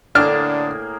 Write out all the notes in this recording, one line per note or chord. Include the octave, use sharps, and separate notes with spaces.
A2 D3 A#3 D4 G#4 F6